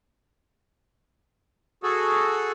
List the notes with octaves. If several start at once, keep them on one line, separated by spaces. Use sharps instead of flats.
F#4 G#4 A4